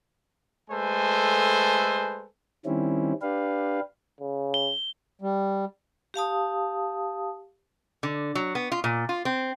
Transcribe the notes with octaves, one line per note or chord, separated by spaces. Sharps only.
G#3 A3 A4 B4 C5 G#5
D#3 G3 C4 C#4 E4
D4 G4 B4 F5
C#3
G7
G3
G4 F5 A5 D#6
D3
F#3
B3
F4
A#2
F4
C4